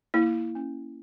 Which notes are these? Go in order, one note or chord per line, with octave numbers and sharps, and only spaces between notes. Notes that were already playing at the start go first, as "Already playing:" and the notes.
A#3 E4
C#4